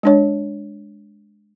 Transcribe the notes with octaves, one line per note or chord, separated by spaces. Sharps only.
G#3 D4 C#5